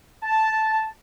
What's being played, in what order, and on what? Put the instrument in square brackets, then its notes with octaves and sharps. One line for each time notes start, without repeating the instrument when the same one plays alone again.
[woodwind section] A5